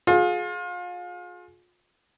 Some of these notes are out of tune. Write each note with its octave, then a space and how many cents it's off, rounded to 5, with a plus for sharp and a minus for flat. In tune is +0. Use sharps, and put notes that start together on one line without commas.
F4 +35 G#4 +25